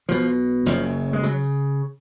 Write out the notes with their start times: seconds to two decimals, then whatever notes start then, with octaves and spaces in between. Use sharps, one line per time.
0.09 B1 B2 F3
0.66 F#1 F#2 C#3 F3
1.13 G#3
1.23 C#3 F#3